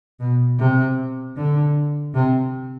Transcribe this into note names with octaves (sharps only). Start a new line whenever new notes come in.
B2
C3
D3
C3